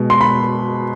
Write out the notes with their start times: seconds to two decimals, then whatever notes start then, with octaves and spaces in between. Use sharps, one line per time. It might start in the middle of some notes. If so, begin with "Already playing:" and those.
Already playing: B2 G#3
0.10 C6
0.21 B5